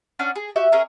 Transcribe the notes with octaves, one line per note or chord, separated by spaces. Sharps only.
C#4 D4 F#5 F6
G#4
F#4 G4 E5
C#4 G#4 A#4